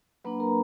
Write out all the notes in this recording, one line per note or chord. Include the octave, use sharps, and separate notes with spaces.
F#3 A#3 D4 B4 B5
A#4 A#5